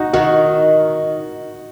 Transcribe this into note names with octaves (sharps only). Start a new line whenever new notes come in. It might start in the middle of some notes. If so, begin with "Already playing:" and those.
Already playing: D#4 F#4
D#3 F#4